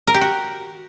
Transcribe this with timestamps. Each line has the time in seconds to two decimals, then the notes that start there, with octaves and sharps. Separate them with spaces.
0.07 A#4
0.14 G4
0.21 F#4